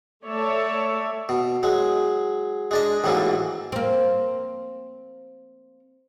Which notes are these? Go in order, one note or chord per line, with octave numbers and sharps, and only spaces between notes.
A3 C#5 D5 E5 A5
B2
F#3 G#3
G#3 D4 D#5
A1 G#2 E3 F#3 A#3
A#3 C4